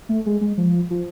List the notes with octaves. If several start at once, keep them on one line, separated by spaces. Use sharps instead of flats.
A3
G#3
G#3
F3
F3